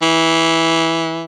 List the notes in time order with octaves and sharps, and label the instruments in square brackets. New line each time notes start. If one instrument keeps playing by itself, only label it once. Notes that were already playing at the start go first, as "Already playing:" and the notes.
[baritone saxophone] E3